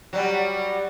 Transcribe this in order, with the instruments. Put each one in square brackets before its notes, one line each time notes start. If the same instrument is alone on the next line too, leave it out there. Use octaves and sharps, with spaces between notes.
[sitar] F#3 G3